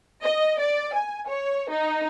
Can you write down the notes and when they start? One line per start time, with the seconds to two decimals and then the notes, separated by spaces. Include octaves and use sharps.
0.24 D#5
0.60 D5
0.94 G#5
1.28 C#5
1.70 D#4